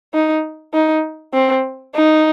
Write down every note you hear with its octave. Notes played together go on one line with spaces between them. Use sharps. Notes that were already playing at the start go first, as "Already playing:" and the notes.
D#4
D#4
C4
D#4